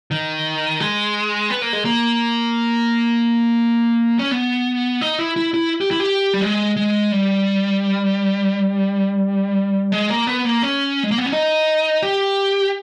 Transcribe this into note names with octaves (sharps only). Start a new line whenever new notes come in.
D#3
G#3
B3
A#3
G#3
A#3
C#4
B3
D#4
E4
E4
E4
G4
E4
G4
G3
G#3
G#3
G3
G#3
A#3
B3
A#3
C#4
G#3
A#3
B3
C#4
D#4
G4